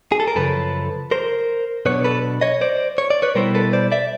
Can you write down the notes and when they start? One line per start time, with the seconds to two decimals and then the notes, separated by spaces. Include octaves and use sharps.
0.12 G#4
0.20 A4
0.28 A#4
0.36 F#2 C#3 F3 A4 B4
1.11 A#4 C5
1.86 B2 F#3 B3 D4 B4 C#5
2.04 A4 B4
2.41 C#5 D#5
2.61 C5 D5
2.98 C#5
3.10 D5
3.22 B4 C#5
3.35 B2 G3 B3 E4 A#4 C5
3.55 A4 B4
3.73 C5 D5
3.92 D5 E5